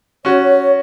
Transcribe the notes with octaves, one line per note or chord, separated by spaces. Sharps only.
C#4 F#4 C#5